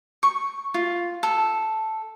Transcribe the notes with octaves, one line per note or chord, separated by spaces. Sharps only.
C#6
F4
A4